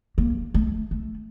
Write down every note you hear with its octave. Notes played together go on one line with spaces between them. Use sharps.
A#3
A3
A3